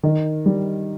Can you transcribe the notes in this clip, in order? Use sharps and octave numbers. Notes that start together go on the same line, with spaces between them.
D#3
G3